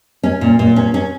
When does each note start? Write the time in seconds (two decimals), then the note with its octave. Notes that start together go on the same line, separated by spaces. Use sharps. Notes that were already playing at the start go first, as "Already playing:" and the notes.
0.23 C#4
0.41 A#2
0.59 A#2
0.76 C#4
0.94 C#4